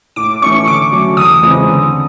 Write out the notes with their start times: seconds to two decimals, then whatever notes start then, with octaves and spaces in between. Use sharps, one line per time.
0.16 A2 D6
0.42 E3 A3 C#4 C#6
0.67 D3 D6
0.92 F#3 A3 C#4
1.17 E2 D#6
1.43 C#3 E3 G#3 C4
1.68 D3